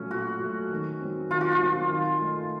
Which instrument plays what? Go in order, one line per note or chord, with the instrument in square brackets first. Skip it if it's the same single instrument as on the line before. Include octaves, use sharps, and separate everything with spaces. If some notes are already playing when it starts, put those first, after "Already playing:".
Already playing: [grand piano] A#2 F#3 A3 [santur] C#4
[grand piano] A#2 [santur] F#4
[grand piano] F#3 A3
D#3
F#3 C4
[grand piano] D#3 [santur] F4
[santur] F#4
F4
[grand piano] F#3 C4
D#3
A3 D#4